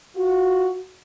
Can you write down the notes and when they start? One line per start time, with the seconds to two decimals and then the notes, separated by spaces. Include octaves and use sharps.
0.16 F4 F#4